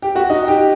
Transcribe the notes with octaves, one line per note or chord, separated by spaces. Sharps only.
G4
F#4
D#4
G4